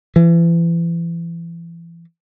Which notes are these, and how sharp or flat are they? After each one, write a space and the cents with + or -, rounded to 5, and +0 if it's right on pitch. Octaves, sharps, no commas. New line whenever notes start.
E3 +35